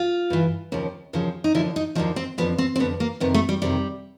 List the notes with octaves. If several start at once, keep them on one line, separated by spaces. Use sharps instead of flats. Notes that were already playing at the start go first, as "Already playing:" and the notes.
Already playing: F4
G2 E3
D#2 C#3 F3
D#2 C#3 F3
D#4
D#2 D3 F3 E4
D#4
D#2 D3 F3 D#4
C4
F2 D3 F3 B3
C4
C4
F2 D3 F3 B3
A#3
F2 C3 D#3 B3
A3
G3
F2 C3 D#3 G3